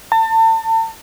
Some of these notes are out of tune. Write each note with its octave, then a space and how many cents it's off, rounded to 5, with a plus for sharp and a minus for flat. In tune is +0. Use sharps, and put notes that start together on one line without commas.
A5 +35